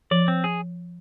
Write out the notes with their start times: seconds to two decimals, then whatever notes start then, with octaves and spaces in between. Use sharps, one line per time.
0.11 F3 D5
0.28 C4
0.44 G#4